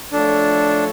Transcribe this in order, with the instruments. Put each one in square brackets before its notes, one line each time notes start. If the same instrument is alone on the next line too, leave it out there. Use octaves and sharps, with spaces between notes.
[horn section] F3 A3 F4 A4 C#5 [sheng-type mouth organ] D4